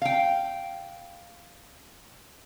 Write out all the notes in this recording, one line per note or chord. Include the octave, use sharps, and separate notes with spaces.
F5 G5